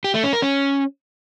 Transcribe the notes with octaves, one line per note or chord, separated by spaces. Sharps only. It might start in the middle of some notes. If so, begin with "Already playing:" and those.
G4
A3
C#4
A#4
C#4